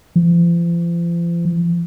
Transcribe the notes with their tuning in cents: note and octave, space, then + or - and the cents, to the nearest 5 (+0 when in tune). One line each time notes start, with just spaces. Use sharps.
F3 -40